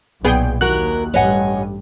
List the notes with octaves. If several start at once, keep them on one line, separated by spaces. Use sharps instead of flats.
B1 A#2 B3 G#4 G5
D#2 E4 F#4 A#4 F#6
A1 G2 B4 C#5 D#5 F#5 G#5